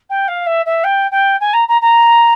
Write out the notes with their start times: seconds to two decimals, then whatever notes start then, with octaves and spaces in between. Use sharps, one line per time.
0.10 G5
0.28 F5
0.46 E5
0.66 E5
0.84 G5
1.11 G5
1.40 G#5
1.53 A#5
1.68 A#5
1.81 A#5